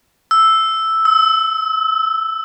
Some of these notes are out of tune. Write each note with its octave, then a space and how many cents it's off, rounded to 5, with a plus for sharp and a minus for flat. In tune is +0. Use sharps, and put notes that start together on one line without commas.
E6 +0
E6 -35